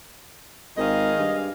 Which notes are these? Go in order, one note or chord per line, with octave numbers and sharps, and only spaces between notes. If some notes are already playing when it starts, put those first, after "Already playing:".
G#1 D#3 G#4 D#5 F5
G2